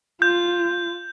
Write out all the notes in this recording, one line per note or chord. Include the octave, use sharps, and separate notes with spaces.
F4 G6